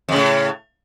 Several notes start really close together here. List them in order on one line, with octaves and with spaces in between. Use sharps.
F2 C#3 A2